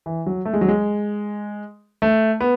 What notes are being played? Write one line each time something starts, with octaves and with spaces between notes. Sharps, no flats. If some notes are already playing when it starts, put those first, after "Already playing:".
E3
F#3
A3
G#3
F#3
G#3
A3
B3